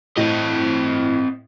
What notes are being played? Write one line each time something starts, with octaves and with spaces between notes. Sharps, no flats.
A2 C4 D#5